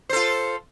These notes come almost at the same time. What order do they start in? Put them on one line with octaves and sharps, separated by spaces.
C5 A4 F4